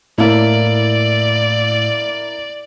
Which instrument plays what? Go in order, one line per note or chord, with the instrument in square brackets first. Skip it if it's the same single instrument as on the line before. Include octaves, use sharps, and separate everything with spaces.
[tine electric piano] A2 [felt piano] A#3 E4 [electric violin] D5